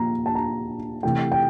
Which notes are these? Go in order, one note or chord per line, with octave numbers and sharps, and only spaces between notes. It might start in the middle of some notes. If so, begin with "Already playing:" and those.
Already playing: A#2 F3 A#3 A#5
A5
A#5
C3 E3 A3 G5
G5